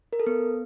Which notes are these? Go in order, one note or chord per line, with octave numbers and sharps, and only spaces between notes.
A#4
A4
B3